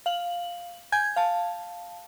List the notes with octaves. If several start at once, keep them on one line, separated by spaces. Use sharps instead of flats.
F5 F#7
G#5 G6 G#6
F5 A5